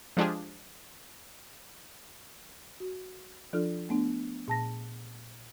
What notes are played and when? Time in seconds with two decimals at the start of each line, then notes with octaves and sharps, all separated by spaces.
0.17 F3 G#3 D4 F4 G4 G#4
2.80 F#4
3.53 F3 D4 F4 A4 F6
3.89 A3 B3 D4
4.48 A#2 A5 A#6